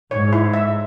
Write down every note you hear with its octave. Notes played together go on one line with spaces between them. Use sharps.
G#2 C#5
E4
E5